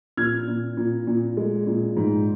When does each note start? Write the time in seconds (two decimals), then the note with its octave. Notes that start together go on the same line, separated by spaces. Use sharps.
0.17 A#2 F6 G#6
0.48 A#2
0.77 A#2
1.07 A#2
1.37 G#3
1.67 A#2
1.97 G#2